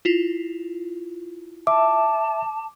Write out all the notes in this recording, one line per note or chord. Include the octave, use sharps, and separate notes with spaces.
E4 F4
E5 A5 D6